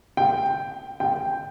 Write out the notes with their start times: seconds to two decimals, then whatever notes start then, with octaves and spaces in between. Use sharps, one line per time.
0.17 G5
1.00 G5